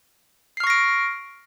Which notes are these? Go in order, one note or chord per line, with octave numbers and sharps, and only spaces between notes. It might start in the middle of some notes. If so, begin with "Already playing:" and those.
C#6 F6 A#6 C7 D7